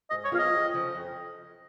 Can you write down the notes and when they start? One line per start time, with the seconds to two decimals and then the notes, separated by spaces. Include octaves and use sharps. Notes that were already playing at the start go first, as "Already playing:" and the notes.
0.10 G#2 D#5
0.25 C#5
0.32 F#3 B3 F4 G#4 F5
0.39 D#5
0.53 F2
0.73 C#3 F3
0.95 F2